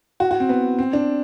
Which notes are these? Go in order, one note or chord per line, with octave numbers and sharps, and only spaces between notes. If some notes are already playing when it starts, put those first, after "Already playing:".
F#4
F#4
C4
B3
C4
D4